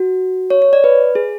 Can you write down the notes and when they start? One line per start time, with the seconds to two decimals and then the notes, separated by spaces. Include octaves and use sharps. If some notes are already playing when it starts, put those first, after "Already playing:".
Already playing: F#4
0.50 C#5
0.62 C#5
0.73 D5
0.84 B4
1.15 G#4